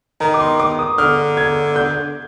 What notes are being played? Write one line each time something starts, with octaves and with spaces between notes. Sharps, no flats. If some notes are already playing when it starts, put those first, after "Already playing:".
D#3 A#5
D6
C6
D6
D#6
D3 F6
G#6
G6